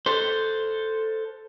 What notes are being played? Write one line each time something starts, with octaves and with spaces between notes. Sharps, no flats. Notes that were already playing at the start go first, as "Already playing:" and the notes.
A4 C5